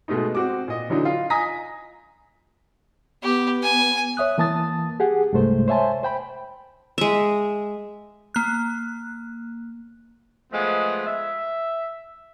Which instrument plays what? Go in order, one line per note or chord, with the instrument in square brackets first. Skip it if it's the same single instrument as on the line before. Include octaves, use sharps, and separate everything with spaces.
[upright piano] B2 G#3 A3 D#4
C4 F#4 D6
A#2 D#5
D3 E3 F#3 D4 D#4
F4
D#5 G#5 A#5 D#6 A#6 B6
[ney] B3 [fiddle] G4
[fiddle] G#5
[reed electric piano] C#5 E5 D#6 F#6
E3 A#3 A5 D#6 A6
G4 G#4 F#5
C2 G2 C3 G#3 A3 C5
C5 C#5 E5 G#5 A5 C6
C5 G5 B5
[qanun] G#3 E5
[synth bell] A#3 F#6
[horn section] F3 G#3 A3 B3
E5